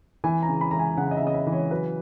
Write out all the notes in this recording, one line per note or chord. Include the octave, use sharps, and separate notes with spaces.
E3 G#5
A#5
C#3
B5
E3 A#5
G#5
C#3 F#5
D#5
E5
C#3 D#5
E5
E3
C#5
F#3 B4